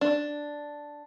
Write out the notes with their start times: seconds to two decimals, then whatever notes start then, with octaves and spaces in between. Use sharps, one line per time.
0.01 D4